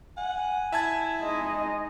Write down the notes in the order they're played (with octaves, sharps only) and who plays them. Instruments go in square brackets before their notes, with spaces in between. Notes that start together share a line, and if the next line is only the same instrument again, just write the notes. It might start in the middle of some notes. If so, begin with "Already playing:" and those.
[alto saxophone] F#5 [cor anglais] G#5
[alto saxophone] E4 [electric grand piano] E5 A5 G#6
[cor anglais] G#3 [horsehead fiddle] D#4 D#5